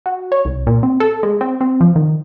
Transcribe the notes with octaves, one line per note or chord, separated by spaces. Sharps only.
F#4
C#5
C2
A#2
C4
A4
G#3
C4
C4
F3
D#3